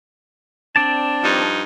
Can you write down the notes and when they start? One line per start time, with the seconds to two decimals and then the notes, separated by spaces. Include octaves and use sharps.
0.76 C4 D4 D5 A5
1.22 G2 F3 D#4